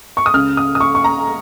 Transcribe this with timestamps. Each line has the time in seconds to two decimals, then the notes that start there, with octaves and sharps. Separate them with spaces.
0.17 C#6
0.26 D#6
0.34 C#2 C#3 F6
0.57 D#6
0.75 D#6
0.80 C#6
0.95 C#6
1.04 A#5